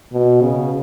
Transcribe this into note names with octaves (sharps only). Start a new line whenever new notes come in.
B2
C#3